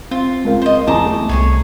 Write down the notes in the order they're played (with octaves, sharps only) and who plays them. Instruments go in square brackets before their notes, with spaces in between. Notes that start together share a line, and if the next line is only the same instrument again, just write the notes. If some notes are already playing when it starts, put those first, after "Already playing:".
[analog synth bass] C4 [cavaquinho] F4
[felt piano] C#2 A#4 F5
[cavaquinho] C5 D#5
[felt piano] E2 A#5 [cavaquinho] A5 D6 D#6
[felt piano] A3
[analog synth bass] C2 [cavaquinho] G#4 C#5 G#5